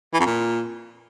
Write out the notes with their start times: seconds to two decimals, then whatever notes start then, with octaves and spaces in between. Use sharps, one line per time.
0.13 E3
0.20 F2
0.26 A#2